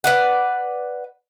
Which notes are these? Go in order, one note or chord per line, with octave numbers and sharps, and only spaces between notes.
B4 D5 F#5